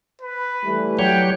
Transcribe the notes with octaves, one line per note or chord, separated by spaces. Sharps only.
B4
E3 G3 A3
F#3 G4 C#5 G5